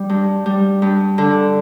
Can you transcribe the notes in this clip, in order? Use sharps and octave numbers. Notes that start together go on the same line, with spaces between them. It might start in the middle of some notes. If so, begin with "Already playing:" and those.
Already playing: G3
G2
G3
G2
D3